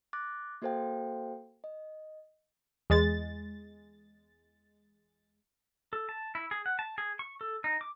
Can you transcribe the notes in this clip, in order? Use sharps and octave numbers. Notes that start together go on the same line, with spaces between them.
D6 F#6 A6 A#6
A#3 F#4 A4 C5 F5 G5
D#5
E2 G#3 A6
A4
A5
E4
G#4
F#5
A5
G#4
C#6
A4
D#4
D6